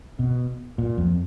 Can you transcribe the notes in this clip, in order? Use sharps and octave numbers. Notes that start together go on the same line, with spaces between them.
B2
A#2
F2